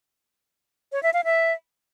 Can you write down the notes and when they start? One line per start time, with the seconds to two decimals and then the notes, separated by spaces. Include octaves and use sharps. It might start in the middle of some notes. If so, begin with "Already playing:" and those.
0.92 C#5
1.03 E5
1.14 F5
1.24 E5